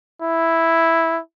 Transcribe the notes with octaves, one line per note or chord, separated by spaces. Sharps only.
E4